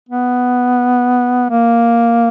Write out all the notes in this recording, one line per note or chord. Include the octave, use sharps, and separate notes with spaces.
B3
A#3